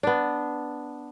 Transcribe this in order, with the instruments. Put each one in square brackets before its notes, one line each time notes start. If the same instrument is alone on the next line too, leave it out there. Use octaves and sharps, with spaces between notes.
[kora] B3 D4